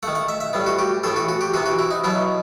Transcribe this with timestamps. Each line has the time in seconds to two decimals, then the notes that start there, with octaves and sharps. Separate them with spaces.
0.03 D#3 A3 F#5
0.15 F#5
0.29 E5
0.40 E5
0.53 A2 G3 B3
0.66 F#4
0.79 G4
1.04 A2 E3 B3 A4
1.16 F#4
1.29 F#4
1.41 G4
1.54 C3 E3 B3 F#4
1.66 F#4
1.79 E4
1.91 D#4
2.04 B2 F#3 B3 E4